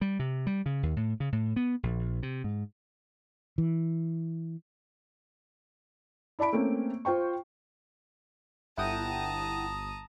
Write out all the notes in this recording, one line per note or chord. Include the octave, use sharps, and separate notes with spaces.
G3
C3
G3
C#3
D#2
A2
C#3
A2
B3
A#1
C3
G#2
E3
E4 D5 A5 B5 D7
A3 A#3 C4 C#4
F4 C5 G5 C#6
G1 E4 F#5 G5 A5 A#5 D#6